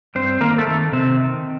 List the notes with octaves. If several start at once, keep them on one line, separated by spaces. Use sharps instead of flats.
G2 C4 C5
D#3 A#3 A#4
A3 A4
D#3
C3 D#3 C4
D#3